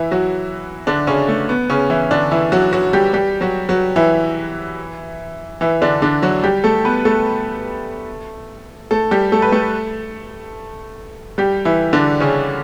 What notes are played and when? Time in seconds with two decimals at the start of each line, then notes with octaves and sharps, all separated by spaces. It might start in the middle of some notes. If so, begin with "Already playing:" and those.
Already playing: E3 E4
0.11 F#3 F#4
0.87 D3 D4
1.07 C#3 C#4
1.29 A3
1.49 B3
1.70 C#3 C#4
1.90 E3 E4
2.11 D3 D4
2.31 E3 E4
2.52 F#3 F#4
2.72 F#3 F#4
2.93 G3 G4
3.14 G3 G4
3.41 F#3 F#4
3.69 F#3 F#4
3.96 E3 E4
5.61 E3 E4
5.82 D3 D4
6.02 D3 D4
6.22 F#3 F#4
6.43 G3 G4
6.64 A3 A4
6.85 B3 B4
7.05 A3 A4
8.91 A3 A4
9.11 G3 G4
9.32 A3 A4
9.42 B4
9.52 A3 A4
11.38 G3 G4
11.65 E3 E4
11.93 D3 D4
12.20 C#3 C#4